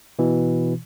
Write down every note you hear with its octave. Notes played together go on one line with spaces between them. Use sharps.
B2 E3